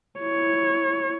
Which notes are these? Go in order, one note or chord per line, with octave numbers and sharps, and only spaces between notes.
E4 C#5